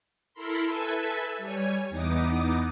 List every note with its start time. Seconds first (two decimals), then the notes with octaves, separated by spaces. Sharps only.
0.33 E4 A4 A#4 B5 C6
0.65 A4 B4 E5 G#5 A5
1.37 G3 C#5 G#5
1.90 E2 B3 D#4 D6 D#6